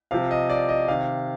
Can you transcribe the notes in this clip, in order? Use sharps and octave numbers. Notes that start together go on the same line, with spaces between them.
C3 F3 F5
D#5
D5
D#5
C3 D#3 F5